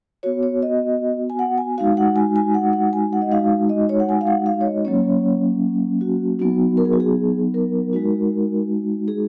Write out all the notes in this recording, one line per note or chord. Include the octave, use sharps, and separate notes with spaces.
B3 F#4 C#5
C#5
D#5
G#5
F#5
G#5
G#3 D#4 F#4 F5
F#5
G#5
G#5
F#5
F#5
G#5
F#5
D#5
G#3 D#4 F#4 F5
D#5
C#5
F#5
G#5
F5
F#5
F5
C#5
D#5
F#3 A#3 C#4 C#5
F#4
F#3 B3 D#4 F#4
A#4
G#4
F#4
G#4
A#4
G#3 D#4 F#4
G#4